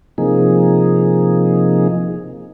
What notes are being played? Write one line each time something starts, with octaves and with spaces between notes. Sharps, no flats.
C3 F3 A#3 D#4 G#4